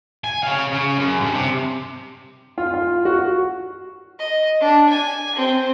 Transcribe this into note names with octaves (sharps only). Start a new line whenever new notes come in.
G#5
C#5 F5
C#3
F#2
G2
C3
F4
F4
F#4
D#5
D4
G#5
C4